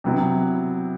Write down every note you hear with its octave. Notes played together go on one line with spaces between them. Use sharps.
C3 F#3 B3 E4